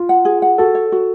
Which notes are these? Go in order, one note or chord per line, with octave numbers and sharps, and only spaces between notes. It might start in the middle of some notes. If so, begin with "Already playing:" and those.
Already playing: F4
F#5
G#4
F#5
F#4 A4
C#5
F#4